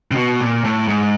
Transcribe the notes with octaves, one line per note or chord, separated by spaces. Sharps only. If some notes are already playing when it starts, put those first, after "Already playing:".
C3
B2
A#2
A2
G#2